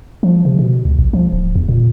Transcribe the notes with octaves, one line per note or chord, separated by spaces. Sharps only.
F3
C3
B2
C#2
A#1
F3
D1
E2
A#2